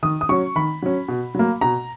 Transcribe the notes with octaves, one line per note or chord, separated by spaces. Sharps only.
D#3 D#6
D#6
F#3 C#4 C#6
D#3 B5
F#3 C#4
B2
F#3 A#3
B2 A#5